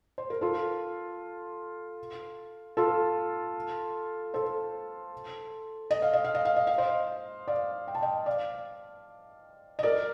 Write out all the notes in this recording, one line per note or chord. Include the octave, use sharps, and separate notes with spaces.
C5
A#4
F4 A4
F4 A4
A4 C5
D#5
F5
D#5
F5
D#5
F5
D#5
F5
C5 D#5
D5 F5
G5
A5
D#5 G5
D5 F5
D#5
A#4 D5